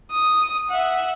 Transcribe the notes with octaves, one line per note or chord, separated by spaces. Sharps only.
D#6
E5 F#5